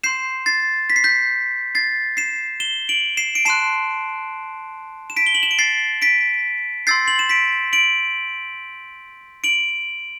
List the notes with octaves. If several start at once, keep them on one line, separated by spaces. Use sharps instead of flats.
C6 G6 C7 E7
A6 C7
B6
C7
G6 B6
A6 C7
C7 E7
E7 G7
D7 F#7
C7 E7
D7
A5 C6 F#6 C7 E7
E7
B6 D7
G7
F#7
E7
D7
A6 C7
B6 D7
C6 E6 G6 A6 C7
F#7
E7
B6 D7
D7 F#7
D7 F#7